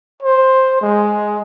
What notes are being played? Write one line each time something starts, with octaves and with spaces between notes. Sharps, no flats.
C5
G#3